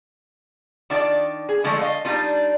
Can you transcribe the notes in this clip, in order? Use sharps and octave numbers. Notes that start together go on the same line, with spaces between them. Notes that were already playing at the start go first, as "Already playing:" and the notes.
D#3 D4 F4 D5
G#4
D3 F3 G#3 A3
D#5 F5
G3 D4 D#4 F4